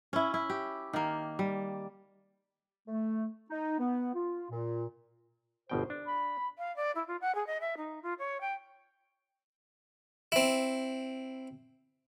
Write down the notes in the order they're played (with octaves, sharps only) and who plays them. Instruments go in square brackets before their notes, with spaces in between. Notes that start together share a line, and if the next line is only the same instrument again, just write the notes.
[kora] C#4 E4
E4
G4
D#3 A#3
G3
[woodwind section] A3
D#4
B3
F4
A#2
[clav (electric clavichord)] G1 B2 G5 [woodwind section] C5
[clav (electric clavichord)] D4
[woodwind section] B5
[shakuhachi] F5
D5
E4
F4
F#5
G#4
D#5
E5
D#4
F4
C#5
G5
[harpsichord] C4 E4